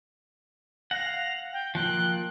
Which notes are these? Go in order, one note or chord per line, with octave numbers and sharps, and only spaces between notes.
F5 F#5 A#6
G5
F3 A#3 G5 F#6